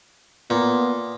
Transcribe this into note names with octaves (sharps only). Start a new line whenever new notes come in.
A#2 B3